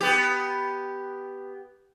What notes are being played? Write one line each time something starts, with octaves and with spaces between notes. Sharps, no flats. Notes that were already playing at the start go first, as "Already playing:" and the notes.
B3 G4